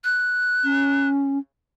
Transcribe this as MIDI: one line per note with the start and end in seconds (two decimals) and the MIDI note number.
0.04 1.08 90
0.64 1.39 61